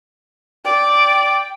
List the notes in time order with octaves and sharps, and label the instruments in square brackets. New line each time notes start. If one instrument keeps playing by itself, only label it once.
[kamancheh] D5 [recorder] G5